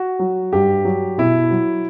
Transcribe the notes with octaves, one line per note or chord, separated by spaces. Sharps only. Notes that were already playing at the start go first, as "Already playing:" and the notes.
Already playing: F#4
F#3
G2 G4
F#3
B2 E4
F#3